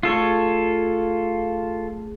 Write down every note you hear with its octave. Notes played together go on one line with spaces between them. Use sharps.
A3 F4 G#4 A4 C#5